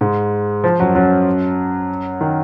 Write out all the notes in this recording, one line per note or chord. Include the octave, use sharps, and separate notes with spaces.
G#2 G#3
F3
F#2 F#3
F#2 F#3
D#3